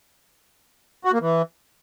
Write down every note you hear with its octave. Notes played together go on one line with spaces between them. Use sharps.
F#4
A#3
E3